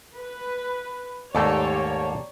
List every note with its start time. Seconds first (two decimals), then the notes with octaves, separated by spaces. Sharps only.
0.15 B4
1.35 D#2 G#2 A3 A#3 G4 A4 C#5 D5